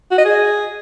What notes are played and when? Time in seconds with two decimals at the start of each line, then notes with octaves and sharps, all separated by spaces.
0.11 F#4
0.18 D#5
0.25 G#4